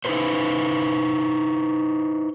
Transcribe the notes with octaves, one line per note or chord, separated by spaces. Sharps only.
D#4 E4 F#4 A4 B4 C5